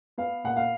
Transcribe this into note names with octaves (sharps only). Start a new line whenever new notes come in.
B3 F5
A#2 F#5
F5